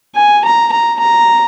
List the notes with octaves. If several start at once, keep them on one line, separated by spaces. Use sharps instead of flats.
G#5
A#5
A#5
A#5